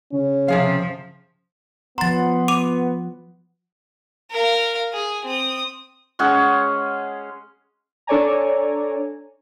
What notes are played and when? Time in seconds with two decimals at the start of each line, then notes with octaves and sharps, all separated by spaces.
0.13 C#3 C#4
0.48 C3 F3 G#4 F5
1.98 F3 B3 F#5 A#5 C6 A6
2.48 D6 D#7 F7
4.31 A#4 F5
4.93 G#4
5.25 C4 D#6
6.19 G#3 C#4 G#4 F#5
8.07 D4 A4 C#5 D5 G#5 A#5